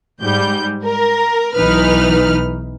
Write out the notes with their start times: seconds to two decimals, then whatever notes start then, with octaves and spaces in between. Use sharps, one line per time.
0.21 G#2 G3 G6
0.84 A#4
1.54 B1 E3 D#4 B4 F6